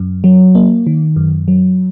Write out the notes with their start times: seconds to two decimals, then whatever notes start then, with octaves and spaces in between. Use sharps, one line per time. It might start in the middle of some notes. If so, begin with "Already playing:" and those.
Already playing: F#2
0.24 F#3
0.55 A#3
0.87 D#3
1.16 F#2
1.48 F#3